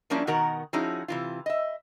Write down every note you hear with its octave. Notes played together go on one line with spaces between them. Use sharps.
F3 G3 A#3 C#4 D4 E4
B2 D#3 F#4 A#4 F#5 A#5
F3 C#4 D#4 E4 F#4 G#4
C3 E3 F4
D#5 E5